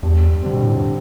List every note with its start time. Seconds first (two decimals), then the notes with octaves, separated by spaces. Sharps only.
0.03 E2 G2
0.42 D3 G3 C4
0.53 B2
0.63 A2
0.73 G2